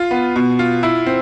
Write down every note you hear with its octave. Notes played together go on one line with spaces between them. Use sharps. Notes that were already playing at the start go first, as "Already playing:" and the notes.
Already playing: F4
B3
B2
F4
E4
C4